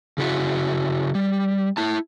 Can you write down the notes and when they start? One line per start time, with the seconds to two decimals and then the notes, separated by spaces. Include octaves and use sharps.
0.18 C#3 E4 F#4
1.15 G3
1.77 E4 A5